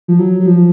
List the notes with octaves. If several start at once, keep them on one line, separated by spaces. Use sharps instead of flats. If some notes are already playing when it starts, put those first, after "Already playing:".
F3
F#3
F#3
F3